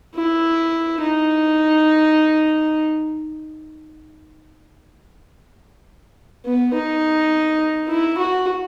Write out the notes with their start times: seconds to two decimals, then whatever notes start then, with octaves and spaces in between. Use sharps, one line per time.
0.15 E4
1.01 D#4
6.45 B3
6.74 D#4
7.88 E4
8.18 F#4